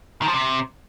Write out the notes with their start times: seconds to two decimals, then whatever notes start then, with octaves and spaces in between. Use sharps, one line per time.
0.22 D#3
0.28 F3
0.34 C3